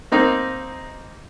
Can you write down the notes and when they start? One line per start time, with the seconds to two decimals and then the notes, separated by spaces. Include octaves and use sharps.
0.12 A#3 C4 D#4